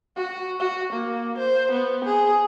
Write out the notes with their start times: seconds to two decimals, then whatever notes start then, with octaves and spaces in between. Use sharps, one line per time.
0.17 F#4
0.60 F#4
0.93 A#3
1.38 C5
1.72 B3
2.05 G#4